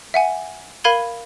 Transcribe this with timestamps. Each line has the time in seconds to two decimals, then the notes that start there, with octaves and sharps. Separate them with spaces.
0.14 E5 F#5 G#5
0.84 A#4 F5 B5 G#6 D#7 G7